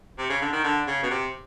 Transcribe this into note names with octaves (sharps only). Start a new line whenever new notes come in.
C3
C#3
D3
D#3
D3
C#3
B2
C3